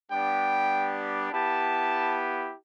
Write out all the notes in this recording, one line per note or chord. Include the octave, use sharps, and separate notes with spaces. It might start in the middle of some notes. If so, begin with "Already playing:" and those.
G3 B3 D4 G4 G5
B3 E4 G4 A5